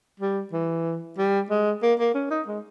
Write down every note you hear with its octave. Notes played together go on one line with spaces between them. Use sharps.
G3
E3
G3
G#3
A#3
A#3
C#4
D#4
G#3